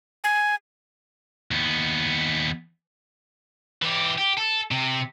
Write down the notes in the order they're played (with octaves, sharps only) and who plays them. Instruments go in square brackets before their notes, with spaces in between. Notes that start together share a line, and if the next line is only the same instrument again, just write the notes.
[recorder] G#5
[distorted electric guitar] D#2 B3
E3 G4
G4
A4
C3